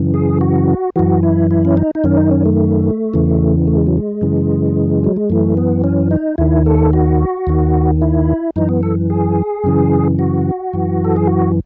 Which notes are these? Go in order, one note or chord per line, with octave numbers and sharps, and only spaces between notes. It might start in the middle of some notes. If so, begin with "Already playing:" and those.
Already playing: F#2 C#3 E3
G#4
F#4
F#2 E3 F#4
E4
E4
C#4
D#4
D#4
F#2 D#3 C#4
D#4
C#4
A3
E2 C#3 E3
A3
G#3
F#3
G#3
F#2 C#3 E3
F#3
G#3
F#2 E3 A3
B3
C#4
D#4
D#2 D#3 E4
A4
F#4
D#2 D#3
E4
F#2 E3 D#4
B3
A4
G#4
F#2 C#3 E3
F#4
F#2 E3
A4
G#4
F#4